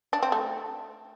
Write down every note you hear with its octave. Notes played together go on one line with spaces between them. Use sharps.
D4
C4
A3